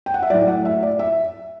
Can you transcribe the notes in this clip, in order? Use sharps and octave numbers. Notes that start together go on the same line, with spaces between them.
G5
F#5
E5
A2 F#3 D5
F#5
E5
D5
E5